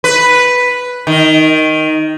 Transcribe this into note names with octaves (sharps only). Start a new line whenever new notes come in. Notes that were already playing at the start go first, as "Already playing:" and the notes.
B4
D#3